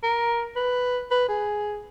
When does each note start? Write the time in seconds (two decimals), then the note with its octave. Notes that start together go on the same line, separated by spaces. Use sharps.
0.03 A#4
0.56 B4
1.11 B4
1.28 G#4